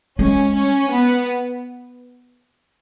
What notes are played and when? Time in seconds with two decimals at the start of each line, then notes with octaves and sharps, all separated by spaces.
0.19 G#3 C#4
0.54 C#4
0.89 B3